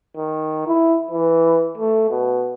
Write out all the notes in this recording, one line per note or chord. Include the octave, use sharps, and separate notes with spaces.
D#3
E4
E3
A3
B2